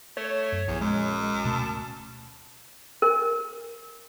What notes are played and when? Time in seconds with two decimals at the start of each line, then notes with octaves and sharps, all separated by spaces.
0.17 A3 C#5
0.52 F#2
0.68 A#1 E2
0.81 F#2 G#3
1.44 D1 B2 A3 A5
3.02 A#4